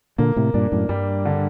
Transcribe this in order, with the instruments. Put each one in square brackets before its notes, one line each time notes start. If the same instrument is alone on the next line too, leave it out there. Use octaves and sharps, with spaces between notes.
[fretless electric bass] A#2 D3 [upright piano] A#3
[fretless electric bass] A2 C3
[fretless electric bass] G2 A#2 [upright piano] D4
[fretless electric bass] F#2 A2
[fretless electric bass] G2 [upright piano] G3
[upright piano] D3